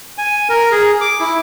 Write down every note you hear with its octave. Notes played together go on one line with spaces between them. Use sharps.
G#5
A#4
G#4
D6
E4